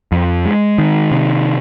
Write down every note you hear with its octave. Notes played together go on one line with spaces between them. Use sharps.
F2
G#3
D#3
C3